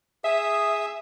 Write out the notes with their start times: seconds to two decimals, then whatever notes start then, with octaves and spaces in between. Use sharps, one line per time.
0.24 G#4 E5 D#6